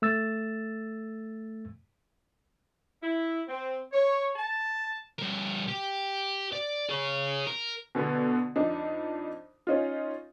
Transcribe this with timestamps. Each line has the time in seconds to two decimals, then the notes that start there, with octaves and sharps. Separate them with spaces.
0.02 A3 E6 A6
3.02 E4
3.47 C4
3.92 C#5
4.36 A5
5.19 G2 A#4
5.68 G4
6.53 D5
6.90 G#4 C#5
7.47 A#4
7.95 B2 D3 B3
8.56 F2 D4 D#4
9.67 C#4 D#4 F4